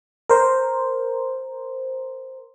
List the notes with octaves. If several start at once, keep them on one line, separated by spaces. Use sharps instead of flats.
A#4 C5